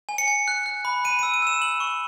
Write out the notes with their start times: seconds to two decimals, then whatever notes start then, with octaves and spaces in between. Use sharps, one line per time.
0.09 G#5
0.18 C#7
0.28 G#5
0.48 F#6
0.66 F#6
0.85 B5
1.04 B5 D#7
1.19 E6 D#7
1.34 D#7
1.42 E6 E7
1.61 E6 F#7
1.80 C#6